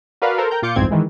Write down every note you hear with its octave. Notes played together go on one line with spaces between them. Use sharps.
F#4 A#4 B4 D5 F5 B5
A4 A#4 C5
A#4 G5 A#5 G6
A#2 F4 D6 G6 C#7
G1 C2 F2 G#2 C4 G#6
D#3 E3 G#3